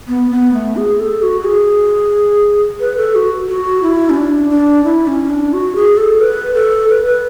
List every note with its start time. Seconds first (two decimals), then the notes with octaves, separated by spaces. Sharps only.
0.08 B3
0.31 B3
0.54 A3
0.76 G#4
1.00 A4
1.22 F#4
1.45 G#4
2.80 B4
2.97 A4
3.15 F#4
3.48 F#4
3.82 E4
4.10 C#4
4.16 D4
4.50 D4
4.84 E4
5.07 C#4
5.30 D4
5.53 F#4
5.75 G#4
5.97 A4
6.20 B4
6.55 A4
6.89 B4
7.06 B4